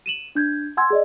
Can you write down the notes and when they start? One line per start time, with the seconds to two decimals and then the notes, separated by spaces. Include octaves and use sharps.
0.06 D#7 E7 F#7
0.35 D4 G6 G#6
0.77 F#5 G#5 C6 E6 G#6
0.90 G#4 D5 D#5